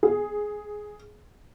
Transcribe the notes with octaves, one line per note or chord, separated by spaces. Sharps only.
G#4